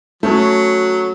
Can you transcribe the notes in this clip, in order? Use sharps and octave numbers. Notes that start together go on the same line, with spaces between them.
F#3 A3 C#4